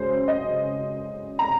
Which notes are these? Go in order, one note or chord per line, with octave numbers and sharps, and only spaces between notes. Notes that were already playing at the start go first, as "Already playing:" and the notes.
Already playing: F#2 C#3 G#3 C5
D#5
A#5